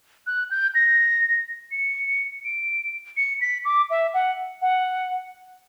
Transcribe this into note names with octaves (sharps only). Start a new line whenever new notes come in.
F#6
G6
A#6
C#7
D7
C#7
B6
D6
E5
F#5
F#5